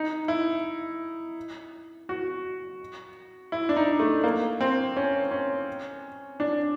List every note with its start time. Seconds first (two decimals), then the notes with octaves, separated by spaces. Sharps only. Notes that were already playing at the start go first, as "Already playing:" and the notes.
Already playing: D#4
0.28 E4
2.09 F#4
3.52 E4
3.69 D4
3.76 D#4
4.00 A3
4.24 A#3
4.61 C4
4.96 C#4
5.31 C#4
6.40 D4